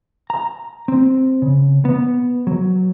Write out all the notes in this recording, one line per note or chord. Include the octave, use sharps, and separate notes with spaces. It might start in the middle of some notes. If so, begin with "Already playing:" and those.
A#5
C4
C#3
B3
F#3